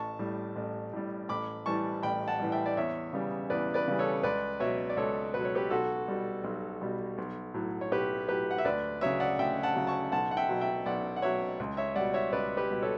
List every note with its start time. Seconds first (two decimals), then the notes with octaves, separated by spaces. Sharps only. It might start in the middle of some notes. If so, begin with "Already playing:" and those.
Already playing: A1 A5 C#6
0.19 A2 G3
0.56 A1
0.93 A2 G3
1.29 A1 B5 D6
1.66 A2 E3 G3 A5 C#6
2.03 A1 G5 B5
2.28 F#5 A5
2.39 A2 E3 G3
2.52 E5 G5
2.66 D5
2.77 E2 C#5 E5
3.13 C#3 E3 G3
3.50 E2 B4 D5
3.74 B4 D5
3.88 C#3 E3 G3
3.99 A4 C#5
4.23 C#2 B4 D5
4.60 B2 F#3 C#5 E5
4.90 D5
4.97 C#2 A4 C#5
5.34 B2 B4
5.39 F#3
5.45 C#5
5.55 G4 B4
5.70 B1 F#4 A4
6.08 B2 G3
6.44 B1
6.81 B2 G3
7.18 B1
7.54 A2 F#3
7.81 C#5
7.91 B1 G4 B4
8.29 A2 F#3 G4 B4
8.51 F#5
8.58 E5
8.65 D2 B4 D5
9.01 C#3 F#3 C#5 E5
9.20 D5 F#5
9.39 D2 E5 G5
9.63 F#5 A5
9.75 C#3 F#3
9.87 A5 C#6
10.12 B1 F#5 A5
10.31 F#5
10.37 E5 G5
10.49 B2 F#3
10.61 E5 G5
10.86 B1 D5 F#5
11.16 F#5
11.22 B2 F#3 C#5 E5
11.60 C#2
11.77 C#5 E5
11.96 B2 G3 D5 F#5
12.14 C#5 E5
12.32 C#2 B4 D5
12.57 G4 B4
12.70 B2 G3
12.82 A4 C#5